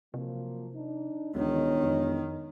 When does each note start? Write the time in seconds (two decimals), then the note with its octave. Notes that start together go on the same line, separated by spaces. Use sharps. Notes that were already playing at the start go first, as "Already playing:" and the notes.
0.14 C3 F3 F#3 A#3
0.74 D4 D#4
1.35 E1 D2 D#3 G#3 B3 C#5
1.83 F2